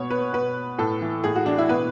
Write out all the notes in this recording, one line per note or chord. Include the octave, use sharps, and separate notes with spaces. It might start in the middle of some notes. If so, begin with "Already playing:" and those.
Already playing: B2 C#5
B4
B2 B4
A2 A4
E3
A2 G#4
F#4
E3 D4
E4
B2 B4